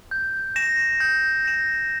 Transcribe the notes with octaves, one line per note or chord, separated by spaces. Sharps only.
G6
A#6 E7
G6
A#6 E7